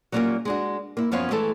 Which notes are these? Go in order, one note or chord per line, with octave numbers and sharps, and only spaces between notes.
F#3 G3 A#3 C#4 F4 A#4
G#3 D4 F#4
A#3 E4
F#2 F3 B3 C#4 C#5 F5
E3 G#3 A3 A4